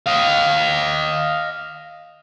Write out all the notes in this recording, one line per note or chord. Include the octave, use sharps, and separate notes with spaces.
D#5 F5